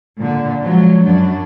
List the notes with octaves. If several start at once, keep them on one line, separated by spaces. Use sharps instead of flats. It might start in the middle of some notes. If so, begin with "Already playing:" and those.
A#2 D3
F3 F#3 G#3
F#2 F#3 D4